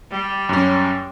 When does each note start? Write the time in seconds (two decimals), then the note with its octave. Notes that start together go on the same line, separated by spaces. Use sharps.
0.11 G3
0.49 F#2 C#4